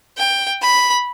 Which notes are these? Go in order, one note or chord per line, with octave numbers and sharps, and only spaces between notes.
G5
B5